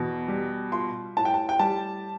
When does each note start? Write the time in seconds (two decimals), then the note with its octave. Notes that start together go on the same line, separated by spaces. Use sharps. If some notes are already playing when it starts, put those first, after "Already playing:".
Already playing: E2 B2
0.28 G3
0.72 F4 C6
1.17 A2 A5
1.25 G5
1.34 A5
1.49 G5
1.59 G3 A5